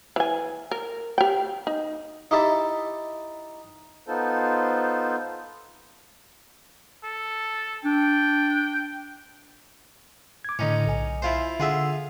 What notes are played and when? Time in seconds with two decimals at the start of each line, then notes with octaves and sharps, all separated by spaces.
0.16 E3 G#5
0.71 A#4
1.18 G4 G5
1.67 D#4
2.31 D#4 E4 G4 E5 A5
4.06 B3 D#4 F4 A4 C5
7.04 A4
7.85 D4 G5
10.45 D6 G#6
10.59 A2 D3 C#4 D#4
10.87 B1 G#5
11.22 E4 F4 C5
11.60 D3 F4 G#4 E5 F#5 E6